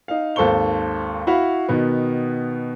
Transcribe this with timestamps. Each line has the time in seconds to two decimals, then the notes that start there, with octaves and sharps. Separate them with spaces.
0.08 D#4 F5
0.36 G#1 D#2 A4 C5 C#6 G7
1.27 E4 F#4 F5 B5
1.69 B2 D#3 B3